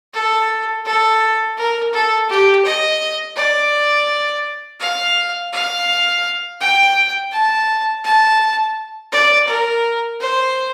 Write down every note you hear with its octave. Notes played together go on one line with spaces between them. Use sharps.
A4
A4
A#4
A4
G4
D#5
D5
F5
F5
G5
A5
A5
D5
A#4
C5